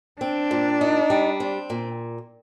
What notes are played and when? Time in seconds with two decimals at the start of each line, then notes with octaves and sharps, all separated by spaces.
0.21 C4 D4
0.51 A#2
0.81 D#4
1.10 G3
1.40 C4
1.70 A#2